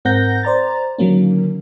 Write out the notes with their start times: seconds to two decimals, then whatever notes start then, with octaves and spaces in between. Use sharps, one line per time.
0.05 G#2 C4 A#4 F#5 G6 A#6
0.43 C5 D5 A#5 A6
0.98 D3 D#3 F#3 A#3 C#4